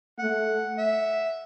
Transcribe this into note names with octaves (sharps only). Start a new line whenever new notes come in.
A3 F#5
E5